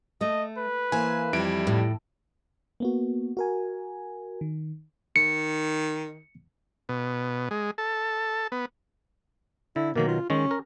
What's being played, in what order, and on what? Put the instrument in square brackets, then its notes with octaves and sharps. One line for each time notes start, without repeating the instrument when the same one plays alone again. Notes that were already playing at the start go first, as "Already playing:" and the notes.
[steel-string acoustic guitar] A3 [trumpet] D#5
[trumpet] B4
[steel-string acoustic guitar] E3 C5 [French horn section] A#3 [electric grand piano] G#5
[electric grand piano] F2 E4 D7 [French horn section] G3
[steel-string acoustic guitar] A2
[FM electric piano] A#3 B3 F#4
F#4 A#4 G#5
D#3
[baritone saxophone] D#3 [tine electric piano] C#7
[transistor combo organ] B2
G#3
A4
B3
[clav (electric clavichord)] D3 [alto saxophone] E4
[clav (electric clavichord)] B2 D#3 F#3 [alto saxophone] A#3
[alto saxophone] F4
[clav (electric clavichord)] D#3 G#3 [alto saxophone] C#4
[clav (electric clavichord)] A#4